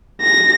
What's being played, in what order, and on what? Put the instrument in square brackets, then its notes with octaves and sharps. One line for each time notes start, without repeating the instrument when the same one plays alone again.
[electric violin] A#6